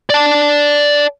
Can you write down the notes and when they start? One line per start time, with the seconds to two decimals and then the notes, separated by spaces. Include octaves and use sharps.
0.10 D5 A5